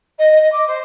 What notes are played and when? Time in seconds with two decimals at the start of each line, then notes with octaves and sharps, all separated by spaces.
0.18 D#5
0.31 D#5
0.52 D6
0.67 C5